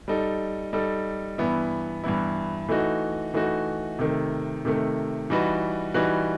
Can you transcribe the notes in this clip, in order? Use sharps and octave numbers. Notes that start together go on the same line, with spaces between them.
G3 D#4 A4
G3 D#4 A4
G2 E3 B3 E4
G2 E3 B3 E4
E3 A3 D#4 F#4
E3 A3 D#4 F#4
C3 D#3 A3
C3 D#3 A3
E3 G3 D#4 F#4 B4
E3 G3 D#4 F#4 B4